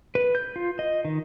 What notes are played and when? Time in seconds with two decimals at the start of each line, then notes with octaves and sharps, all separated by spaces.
0.15 B4
0.35 G6
0.56 F4
0.79 D#5
1.05 D#3